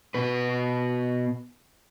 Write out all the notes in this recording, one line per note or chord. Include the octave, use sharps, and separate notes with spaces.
B2 B4